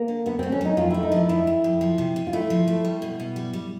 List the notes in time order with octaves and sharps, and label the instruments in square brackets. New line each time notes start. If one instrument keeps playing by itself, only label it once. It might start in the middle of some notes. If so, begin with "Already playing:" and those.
Already playing: [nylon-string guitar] A#3
[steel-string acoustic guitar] D3
[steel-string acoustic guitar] D3 [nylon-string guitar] B3
[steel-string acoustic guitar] A3 [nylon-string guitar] C4
[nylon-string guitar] C#4
[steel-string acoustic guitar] F#3 [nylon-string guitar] D#4
[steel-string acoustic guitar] F2 [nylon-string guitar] F4
[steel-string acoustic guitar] A3 [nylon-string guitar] E4
[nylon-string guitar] D#4
[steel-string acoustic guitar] F3 [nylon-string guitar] E4
[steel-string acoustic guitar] F2 [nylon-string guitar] E4
[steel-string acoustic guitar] F2
F2
F3
C3
C3
[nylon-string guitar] F4
[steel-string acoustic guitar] A3 [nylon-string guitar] E4
[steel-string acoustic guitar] F3
A3
G3
B2
B2
G3
G3